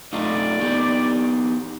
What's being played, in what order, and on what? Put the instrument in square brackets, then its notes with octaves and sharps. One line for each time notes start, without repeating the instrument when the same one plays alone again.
[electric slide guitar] A3 D#4 F4 [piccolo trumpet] D5
[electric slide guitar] B3 D#4 G4